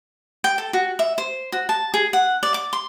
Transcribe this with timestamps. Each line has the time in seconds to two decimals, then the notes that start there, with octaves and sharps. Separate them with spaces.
0.44 G5
0.58 A4
0.73 F#4
0.99 E5
1.18 C5
1.52 F#4
1.69 A5
1.94 G#4
2.13 F#5
2.43 D5
2.54 D6
2.73 C6